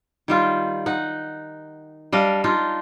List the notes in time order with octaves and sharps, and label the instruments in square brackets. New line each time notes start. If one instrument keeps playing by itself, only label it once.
[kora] D#3 G3 F4
D#4 F#5
G3 D4 D#5 F5
D4 D#4 F4